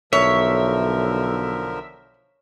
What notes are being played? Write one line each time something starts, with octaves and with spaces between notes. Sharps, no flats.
B1 D3 F3 A#4 C#5 E5